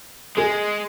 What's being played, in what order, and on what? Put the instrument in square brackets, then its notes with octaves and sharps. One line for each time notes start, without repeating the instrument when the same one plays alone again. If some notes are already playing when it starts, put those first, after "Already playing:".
[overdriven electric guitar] G#3 [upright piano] G#4